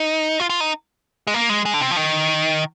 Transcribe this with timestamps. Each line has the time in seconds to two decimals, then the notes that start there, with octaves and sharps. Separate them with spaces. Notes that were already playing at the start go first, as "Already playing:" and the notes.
Already playing: D#4
0.40 F4
0.50 F4
0.60 D#4
1.27 G#3
1.34 A#3
1.49 G#3
1.65 G#3
1.74 D3
1.81 C3
1.91 F3
1.97 D#3